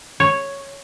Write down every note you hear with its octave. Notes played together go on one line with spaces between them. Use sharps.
C#5